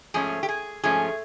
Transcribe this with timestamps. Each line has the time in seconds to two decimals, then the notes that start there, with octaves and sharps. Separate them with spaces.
0.14 G#2 F3 A3 C#4 G#4
0.43 G4
0.49 G#4
0.83 G#2 F3 A3 C#4 G#4